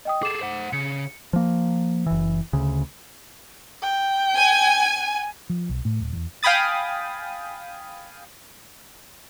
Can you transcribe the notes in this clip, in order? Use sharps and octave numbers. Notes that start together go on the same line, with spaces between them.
D#5 G5 D#6
G#4 A4 D6 E7
C5 F#5
C#3 C#7
F3 A#3
F#1 E3
D2 C#3
G5
G#5
F3
B1
A2
D#1
E2
F5 G5 G#5 B5 D#6 A6